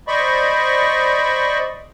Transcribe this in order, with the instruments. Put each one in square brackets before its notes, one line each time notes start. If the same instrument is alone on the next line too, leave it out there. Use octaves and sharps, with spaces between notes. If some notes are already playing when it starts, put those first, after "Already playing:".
[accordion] C5 D5 D#5 B5 C#6